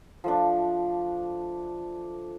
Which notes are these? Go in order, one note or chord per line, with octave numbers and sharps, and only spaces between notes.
F3 A3 D4